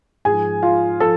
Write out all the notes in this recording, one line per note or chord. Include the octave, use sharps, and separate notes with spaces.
G#2 F3 G#4 G#5
F4 F5
F3 A4 A5